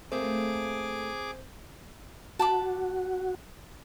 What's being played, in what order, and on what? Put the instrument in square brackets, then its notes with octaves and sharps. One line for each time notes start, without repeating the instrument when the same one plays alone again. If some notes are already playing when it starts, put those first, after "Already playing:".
[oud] A3 A#3 [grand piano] C4 [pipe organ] G#4 D6
[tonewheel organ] F#4 [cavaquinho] A5 B5 D6